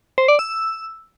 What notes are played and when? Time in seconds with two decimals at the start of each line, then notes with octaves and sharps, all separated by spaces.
0.18 C5
0.28 D5
0.39 E6